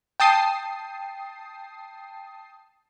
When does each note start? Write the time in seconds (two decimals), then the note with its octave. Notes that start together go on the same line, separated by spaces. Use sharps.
0.20 G5 A5 D#6 C7